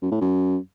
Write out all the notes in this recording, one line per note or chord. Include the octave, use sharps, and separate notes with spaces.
F#2
A2
F#2